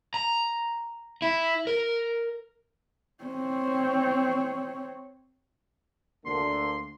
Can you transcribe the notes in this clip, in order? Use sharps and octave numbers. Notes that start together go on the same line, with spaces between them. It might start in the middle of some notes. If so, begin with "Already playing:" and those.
A#5
E4
A#4
C4 C#5
D2 D3 A#3 C6